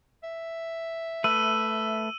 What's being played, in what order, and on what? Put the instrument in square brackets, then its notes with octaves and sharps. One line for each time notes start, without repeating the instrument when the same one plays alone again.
[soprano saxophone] E5
[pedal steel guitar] A3 B4 [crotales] E6 D#7 F#7